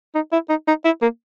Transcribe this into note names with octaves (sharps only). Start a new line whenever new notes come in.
D#4
E4
D#4
D#4
E4
A#3